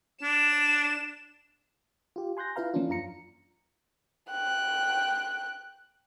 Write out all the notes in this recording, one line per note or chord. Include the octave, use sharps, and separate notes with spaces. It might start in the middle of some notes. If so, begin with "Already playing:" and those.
D4 E7
F4 G4
G#5 C6 F#6 G6 A#6
E4 F4 B4 F5 A#5
E3 F3 A#3 C#4 D4 F4
F#2 F4 A#5 C#7
G5 F#6